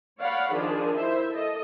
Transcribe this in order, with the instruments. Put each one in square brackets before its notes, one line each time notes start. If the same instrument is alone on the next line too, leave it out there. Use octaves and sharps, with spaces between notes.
[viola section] C#5 D5 F5 F#5 B5
D#3 F3 D4 G#4
E4 C5 E5
A4 D#5